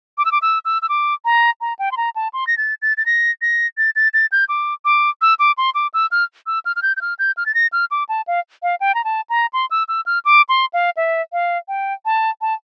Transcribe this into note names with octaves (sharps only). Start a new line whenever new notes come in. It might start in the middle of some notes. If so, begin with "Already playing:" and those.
D6
E6
D6
E6
E6
E6
D6
A#5
A#5
G5
C6
A#5
A5
C6
A#6
A6
A6
A6
A#6
A#6
A6
A6
A6
G6
D6
D6
E6
D6
C6
D6
E6
F6
E6
F6
F6
G6
G6
F6
G6
F6
A6
A#6
F6
D6
A5
F5
F5
G5
A#5
A5
A#5
C6
E6
E6
F6
D6
C6
F5
E5
F5
G5
A5
A5